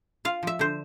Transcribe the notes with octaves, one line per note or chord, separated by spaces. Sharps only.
F4 F5
F3 E5
D3 C5